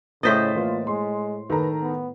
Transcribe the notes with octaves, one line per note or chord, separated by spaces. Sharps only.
A2 C#3 C5 D#5 A6 B6
E3 A#3 F4
G#3 C6
D#3 A4 B4 A#5
B3